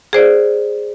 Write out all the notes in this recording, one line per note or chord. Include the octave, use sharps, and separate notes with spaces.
G#4 C5 D5